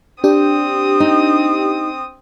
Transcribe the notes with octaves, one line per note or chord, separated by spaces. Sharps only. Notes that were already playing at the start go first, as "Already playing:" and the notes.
C4 D4 G4 G5 D#6
D#4